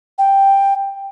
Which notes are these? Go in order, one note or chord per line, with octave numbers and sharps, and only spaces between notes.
G5